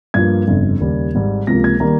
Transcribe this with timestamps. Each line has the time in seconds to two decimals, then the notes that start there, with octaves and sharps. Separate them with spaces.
0.14 G2 F3 A#3 G#6
0.48 G1 F2 C#3
0.80 D#2 C#3 G3
1.14 G#1 G#2 G3
1.47 C#2 C3 F3 A#3 A#6
1.64 G#6
1.80 D#3 G3 A#3 A#5